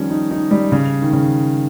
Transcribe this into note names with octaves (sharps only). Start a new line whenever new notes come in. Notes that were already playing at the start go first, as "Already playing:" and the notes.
Already playing: D#3 F3 G3 C#4
D#4
D#4
G3
C#3
D#3
C#3